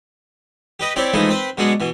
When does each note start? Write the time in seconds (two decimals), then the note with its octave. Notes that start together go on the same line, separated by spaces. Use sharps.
0.80 G4 B4 D#5
0.96 C4 E4 G4 C#5 D5
1.13 E3 F3 G#3 A3 D#4 E4
1.29 C4 B4 C5
1.58 B2 F#3 G#3 D4 F#5
1.80 B2 E3